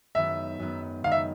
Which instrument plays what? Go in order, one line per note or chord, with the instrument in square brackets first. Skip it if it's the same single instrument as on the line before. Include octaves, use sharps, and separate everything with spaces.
[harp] F#2 D#3 G#3 B3 [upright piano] E5
[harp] F#2 D#3 G#3 B3
[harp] F#2 D#3 G#3 B3 [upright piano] F5
[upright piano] E5